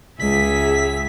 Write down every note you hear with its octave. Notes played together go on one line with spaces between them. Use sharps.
C#2 G#4 E5 B6